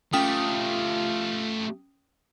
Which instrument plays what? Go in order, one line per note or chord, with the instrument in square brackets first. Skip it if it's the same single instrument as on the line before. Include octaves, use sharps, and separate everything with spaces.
[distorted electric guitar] A3 G4 [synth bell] C#4 G5 D#6 [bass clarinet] F4